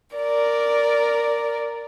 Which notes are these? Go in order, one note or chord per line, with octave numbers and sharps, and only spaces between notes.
A#4 D5